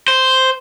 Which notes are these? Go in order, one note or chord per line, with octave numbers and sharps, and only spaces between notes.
C5